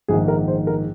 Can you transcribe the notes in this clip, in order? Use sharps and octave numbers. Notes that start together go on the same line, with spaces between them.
A#1 G#2 D#3 G#4
A#4
C5
A#4